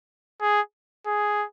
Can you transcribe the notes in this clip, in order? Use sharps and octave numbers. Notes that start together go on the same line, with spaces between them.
G#4
G#4